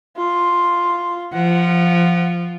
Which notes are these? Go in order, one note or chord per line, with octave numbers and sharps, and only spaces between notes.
F4
F3 F#5